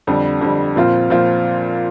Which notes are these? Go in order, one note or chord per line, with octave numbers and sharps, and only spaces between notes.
F2 D3 G3
F2 D3 G3
A#2 F3 C4 F4
A#2 F3 C4 F4